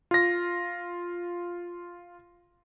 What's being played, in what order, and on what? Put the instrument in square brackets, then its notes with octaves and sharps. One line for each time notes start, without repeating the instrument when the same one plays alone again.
[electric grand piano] F4 A#6